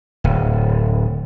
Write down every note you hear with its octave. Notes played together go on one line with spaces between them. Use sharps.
D1